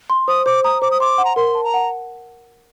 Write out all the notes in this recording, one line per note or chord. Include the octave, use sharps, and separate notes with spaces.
C6
C5 D#6
C5 D6
A#5 D#6
C5 D6
D#6
C6 D6
F#5
A#5
A#4 C6
A5
A#5
F#5